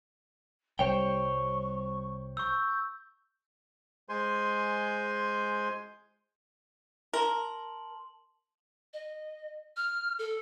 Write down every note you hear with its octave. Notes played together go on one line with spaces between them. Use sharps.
C2 G3 C5 C#5 G5 C#6
C#6 E6 G6
G#3 C5 G#5 C6
A#4 A5 C6 F#7
D#5
F6
A4